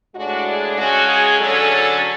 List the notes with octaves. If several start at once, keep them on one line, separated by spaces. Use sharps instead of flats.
A2 G#3 D4 F#4
G#4
C#3 G#3 C#4 F#4
G#4
D3 F#3 C#4 A4
A4